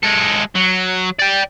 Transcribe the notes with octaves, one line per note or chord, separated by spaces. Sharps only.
G#3 A4
F#3
D5 G5